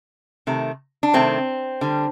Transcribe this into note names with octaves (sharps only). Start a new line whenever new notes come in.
C3 D#3 A3
D4
C3 D#3 A3 C4
D3 G3